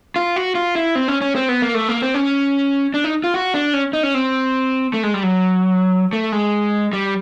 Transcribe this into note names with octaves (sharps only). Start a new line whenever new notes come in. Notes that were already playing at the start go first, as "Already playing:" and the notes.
F4
F#4
F4
E4
C4
C#4
C#4
C4
B3
A#3
A3
A#3
C4
C#4
D4
D#4
F4
F#4
D4
C#4
D#4
C#4
C4
A3
G#3
G3
F#3
A3
G#3
G3